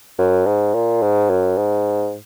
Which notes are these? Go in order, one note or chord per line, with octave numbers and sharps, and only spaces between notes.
F#2
G#2
A#2
G#2
F#2
G#2